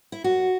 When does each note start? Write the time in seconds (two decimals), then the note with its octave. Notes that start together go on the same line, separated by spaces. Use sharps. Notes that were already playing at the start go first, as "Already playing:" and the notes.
0.12 E4
0.24 F#2 F#4